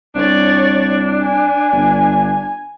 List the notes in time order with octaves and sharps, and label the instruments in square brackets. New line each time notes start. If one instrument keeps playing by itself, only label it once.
[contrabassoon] C2 [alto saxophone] D4 [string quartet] C#5 D5
[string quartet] G#5
[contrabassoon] G1